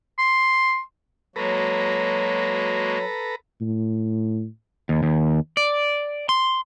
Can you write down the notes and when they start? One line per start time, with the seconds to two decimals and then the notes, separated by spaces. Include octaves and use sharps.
0.18 C6
1.36 F#3 G#3 A#3 F#4 A4 B4 A#5
3.61 A2
4.89 D#2
5.03 D#2
5.57 D5
6.29 C6